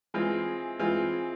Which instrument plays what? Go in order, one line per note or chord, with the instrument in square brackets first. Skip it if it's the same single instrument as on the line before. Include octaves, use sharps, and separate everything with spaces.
[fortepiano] E3 G#3 C4 F4
E3 G#3 C4 F4